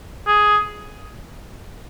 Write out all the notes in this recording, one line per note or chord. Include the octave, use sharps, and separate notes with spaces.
G#4